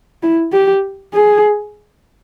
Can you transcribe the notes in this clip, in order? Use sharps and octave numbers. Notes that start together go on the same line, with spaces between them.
E4
G4
G#4